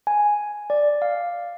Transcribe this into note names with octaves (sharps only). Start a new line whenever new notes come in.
G#5
D5
F5